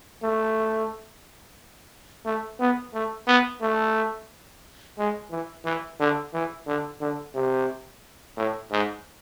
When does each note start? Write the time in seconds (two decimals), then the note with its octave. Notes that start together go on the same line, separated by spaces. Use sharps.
0.23 A3
2.26 A3
2.60 B3
2.94 A3
3.28 B3
3.62 A3
4.98 G#3
5.31 E3
5.65 E3
6.00 D3
6.34 E3
6.67 D3
7.01 D3
7.35 C3
8.37 A2
8.72 G#2